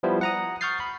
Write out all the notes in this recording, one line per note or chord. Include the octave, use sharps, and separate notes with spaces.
F3 G3 B3 E4 C5
F#5 A#5 D#6
C#6 D#6 F6 G6 A6 C7
B5